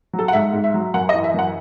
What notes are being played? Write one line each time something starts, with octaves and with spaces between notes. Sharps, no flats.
F#3
A4
F#5
G#2 E5
G#2
E5
F#3
F#2 F#5
D#5
E3
E5
F#2 F#5